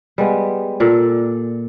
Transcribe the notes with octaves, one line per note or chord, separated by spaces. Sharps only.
G3 G#3 B3
A#2 A4 D5